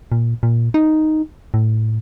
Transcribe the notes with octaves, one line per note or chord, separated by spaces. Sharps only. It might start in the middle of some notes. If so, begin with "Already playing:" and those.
A#2
A#2
D#4
A2